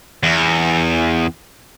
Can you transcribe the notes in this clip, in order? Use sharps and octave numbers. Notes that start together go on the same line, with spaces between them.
E2